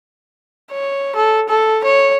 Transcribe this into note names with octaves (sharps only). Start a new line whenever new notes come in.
C#5
A4
A4
C#5